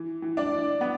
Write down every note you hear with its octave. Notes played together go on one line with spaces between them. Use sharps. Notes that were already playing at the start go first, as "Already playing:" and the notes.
Already playing: E3
E3
D4 D5
E3
B3